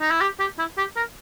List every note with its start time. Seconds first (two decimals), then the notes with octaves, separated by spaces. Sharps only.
0.01 D#4
0.11 E4
0.21 G4
0.40 G4
0.58 E4
0.78 G4
0.96 A#4